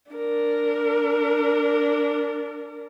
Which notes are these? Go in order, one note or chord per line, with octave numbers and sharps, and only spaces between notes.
D4 A#4